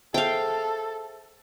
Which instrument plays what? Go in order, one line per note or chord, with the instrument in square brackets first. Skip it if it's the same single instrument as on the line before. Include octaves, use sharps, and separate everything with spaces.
[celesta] G#4 C5 E5 [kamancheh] A4 [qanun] F5 G5